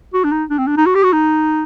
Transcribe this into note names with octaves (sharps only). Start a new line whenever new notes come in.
F#4
D4
D#4
D4
C4
D4
D#4
F#4
G4
F#4
D#4